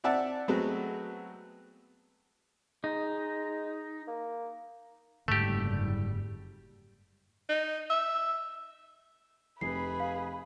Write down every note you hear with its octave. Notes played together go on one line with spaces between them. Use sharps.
C4 D5 E5 F#5 A5
F#3 G#3 A3 B3 C4 F#4
G#3 D#4
A#3
F#1 G#2 D3 G3 A3 G4
D#4
E5
F1 G#4 B4 B5 C7
F5